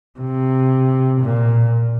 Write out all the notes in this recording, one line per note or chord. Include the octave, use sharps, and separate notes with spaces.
C3
A#2